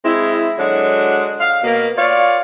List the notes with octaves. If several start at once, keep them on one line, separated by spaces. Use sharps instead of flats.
G#3 C4 E4
D3 F#3 G#3 D4 F#4
F5
B2 A#3
F4 C#5 D5 F5